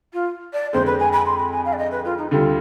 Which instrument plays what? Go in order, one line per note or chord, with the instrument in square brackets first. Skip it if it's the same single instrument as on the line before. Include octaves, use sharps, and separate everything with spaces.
[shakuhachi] F4
D5
[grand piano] F2 D3 G#3 [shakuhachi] C5
[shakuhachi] B4
G#5
B5
C6
B5
G#5
F5
D5
D#5
B4
F4
D#4
[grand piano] D2 D3 G3 [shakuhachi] F4